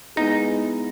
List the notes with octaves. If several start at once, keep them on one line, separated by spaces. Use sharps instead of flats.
G#3 B3 D#4 E4 G#4